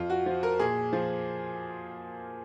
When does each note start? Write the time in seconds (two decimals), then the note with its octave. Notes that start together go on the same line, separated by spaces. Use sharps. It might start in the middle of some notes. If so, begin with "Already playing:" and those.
Already playing: F2 F4
0.10 F#4
0.26 F3
0.43 A#4
0.59 A#2 G#4
0.93 F3